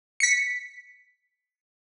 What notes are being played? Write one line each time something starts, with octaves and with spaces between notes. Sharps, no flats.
B6 C#7